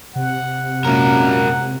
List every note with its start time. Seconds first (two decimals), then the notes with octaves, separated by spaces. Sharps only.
0.16 C3 F#5
0.85 F#2 A#2 G#3 A#3 A#4